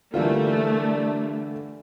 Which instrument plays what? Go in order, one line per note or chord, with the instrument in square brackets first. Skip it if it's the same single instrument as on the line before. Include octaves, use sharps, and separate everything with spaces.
[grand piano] D3 E3 [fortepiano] G3 A#3 F4 [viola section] A3 [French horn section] D4